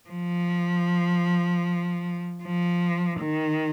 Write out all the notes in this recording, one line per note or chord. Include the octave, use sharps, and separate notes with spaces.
F3
F3
D#3